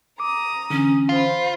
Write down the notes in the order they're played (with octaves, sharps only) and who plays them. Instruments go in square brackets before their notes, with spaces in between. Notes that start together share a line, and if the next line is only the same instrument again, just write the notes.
[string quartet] A#5 D#6 [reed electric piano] D6
[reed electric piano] D3 E3 [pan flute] C#4
[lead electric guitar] F4 [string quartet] C5 B5